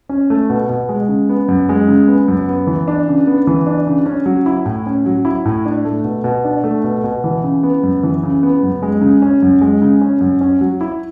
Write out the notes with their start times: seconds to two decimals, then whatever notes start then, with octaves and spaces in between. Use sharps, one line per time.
0.09 C#4
0.30 A3
0.50 B2
0.69 B2
0.89 G#3
1.09 C#3
1.29 B3
1.48 F#2
1.69 G#3
1.88 C#3
2.08 B3
2.28 F#2
2.48 B3
2.67 E3
2.88 D4
3.08 C#3
3.27 B3
3.47 E3
3.67 D4
3.87 C#3
4.06 C#4
4.26 F#3
4.46 E4
4.66 A2
4.86 C#4
5.06 F#3
5.25 E4
5.45 A2
5.66 D4
5.85 A3
6.04 B2
6.24 B2
6.45 D4
6.64 A3
6.84 B2
7.04 B2
7.24 E3
7.44 C#3
7.63 B3
7.83 F#2
8.03 E3
8.23 C#3
8.43 B3
8.63 F#2
8.82 G#3
9.01 C#3
9.22 C#4
9.42 F#2
9.61 G#3
9.82 C#3
10.01 C#4
10.21 F#2
10.41 C#4
10.61 F#3
10.81 E4